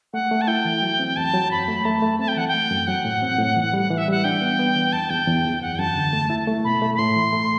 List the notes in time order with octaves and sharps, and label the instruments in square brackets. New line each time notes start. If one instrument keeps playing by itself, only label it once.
[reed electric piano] A3 [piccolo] F#5
[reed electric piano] A3
[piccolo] A5
[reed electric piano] E4 [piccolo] G5
[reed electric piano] E3
F#3
C4
[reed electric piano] E2 [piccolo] A5
[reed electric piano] F#3
[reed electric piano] F#2 [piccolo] B5
[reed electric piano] A3
[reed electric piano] A3 [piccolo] A5
[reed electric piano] A3
[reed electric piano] C4 [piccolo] A5
[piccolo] G5
[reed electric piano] E3 [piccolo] F#5
[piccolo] G5
[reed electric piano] A3
F#2
[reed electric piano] F#3 [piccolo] F#5
[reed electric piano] A2
C4
A2
E3
G3
E3
[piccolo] E5
[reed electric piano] G3 [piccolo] F#5
[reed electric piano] D4 [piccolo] G5
[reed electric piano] B3
B3
E3
[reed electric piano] E2 [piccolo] A5
[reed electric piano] E2 [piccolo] G5
[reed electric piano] E2
E2
[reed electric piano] F#2 [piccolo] F#5
[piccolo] G5
[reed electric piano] F#2 [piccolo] A5
[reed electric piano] D3
A3
E4
A3
[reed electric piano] B2 [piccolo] B5
[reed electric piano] A3
[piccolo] B5
[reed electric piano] A2 [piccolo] C6
[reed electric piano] E3
A3